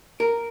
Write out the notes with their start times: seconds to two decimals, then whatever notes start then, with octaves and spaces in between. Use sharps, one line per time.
0.20 A#4